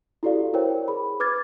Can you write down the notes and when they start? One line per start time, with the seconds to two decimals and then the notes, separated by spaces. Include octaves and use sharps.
0.23 E4 F#4 G4 A4 D5 F5
0.54 E4 A#4 C5 C#5 G5
0.88 G#4 B5
1.20 B4 D6 F6 G#6 A6